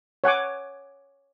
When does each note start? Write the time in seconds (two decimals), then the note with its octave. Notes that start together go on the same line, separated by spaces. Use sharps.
0.24 C#5 F#5 G#5 D6